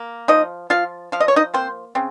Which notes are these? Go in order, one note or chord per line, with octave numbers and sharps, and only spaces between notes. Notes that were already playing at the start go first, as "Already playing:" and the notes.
Already playing: A#3
F3 D#4 D#5
F3 F4 F5
F3 F5
D#5
C#5
D#4 D#5
A#3 C4 C5
C#3 C4